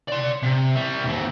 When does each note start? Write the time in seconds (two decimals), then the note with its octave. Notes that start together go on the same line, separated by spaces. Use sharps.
0.08 D5 C6
0.43 C3
0.76 G3 E5
1.05 D#2 C4